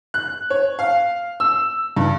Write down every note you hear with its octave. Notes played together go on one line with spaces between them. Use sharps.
F#6
C#5
F5
E6
G2